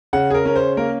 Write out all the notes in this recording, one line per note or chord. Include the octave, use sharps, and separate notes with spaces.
C#3 F#5
G#4
A#4
C#4 A#4
C5
A#3 A#4